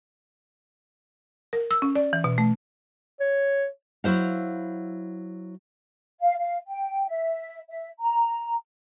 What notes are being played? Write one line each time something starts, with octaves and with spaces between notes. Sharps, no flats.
A#4
E6
C#4
D5
E3
B2
A3
C#5
F#3 E4 C5 F5
F5
F5
G5
E5
E5
A#5